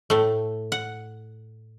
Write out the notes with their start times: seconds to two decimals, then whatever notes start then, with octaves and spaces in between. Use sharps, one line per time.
0.10 A2 A3
0.72 F#5